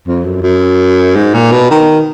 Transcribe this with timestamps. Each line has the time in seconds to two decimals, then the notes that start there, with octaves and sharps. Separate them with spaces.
0.07 F2
0.25 F#2
0.43 F#2
1.16 G#2
1.34 A#2
1.52 B2
1.71 D#3